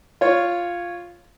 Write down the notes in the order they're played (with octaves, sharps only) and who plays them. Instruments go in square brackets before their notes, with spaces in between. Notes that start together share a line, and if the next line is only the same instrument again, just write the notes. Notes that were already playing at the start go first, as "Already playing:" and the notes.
[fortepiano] F4 C#5